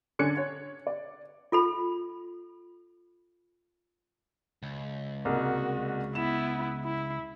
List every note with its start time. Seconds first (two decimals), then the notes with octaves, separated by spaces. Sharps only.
0.19 D3 C#4 D4 F#6 G#6 C#7
0.37 C#5
0.87 D5
1.52 F4 A4 B5
4.63 C#2
5.25 C2 G#3 A#3 F#4
6.15 B3 E4 E7
6.85 E4